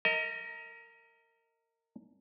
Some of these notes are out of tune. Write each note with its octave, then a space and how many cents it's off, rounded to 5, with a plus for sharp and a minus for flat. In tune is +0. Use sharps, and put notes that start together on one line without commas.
A#4 -25 D#5 +30